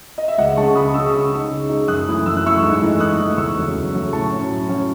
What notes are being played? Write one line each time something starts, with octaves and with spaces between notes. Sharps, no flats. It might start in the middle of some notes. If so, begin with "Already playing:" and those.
D#5
E5
C#2 D#5 F#5
C#3 G#3 A5 C#6
C#2 B5 D#6
C#3 G#3 C#6 E6
D#6
C#3 C#6 E6
G#3 D#4
C#3
G#3 D#4
F#2 D#6 F#6
E3 A3 E4
F#2 E6
F#6
E3 A3 E4 C#6 E6
G#2
E3 A3 D#4
G#2 D#6 F#6
E3 A3 D#4
E2 C#6 E6
C#3 F#3 A3
E2
C#3 F#3 A3
A2 A5 C#6
F#3 C#4
A2
F#3 C#4